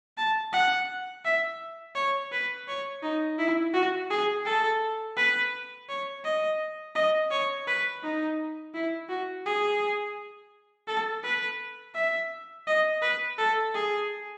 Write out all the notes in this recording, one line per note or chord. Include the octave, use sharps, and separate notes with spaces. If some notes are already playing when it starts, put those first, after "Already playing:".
A5
F#5
E5
C#5
B4
C#5
D#4
E4
F#4
G#4
A4
B4
C#5
D#5
D#5
C#5
B4
D#4
E4
F#4
G#4
A4
B4
E5
D#5
B4
A4
G#4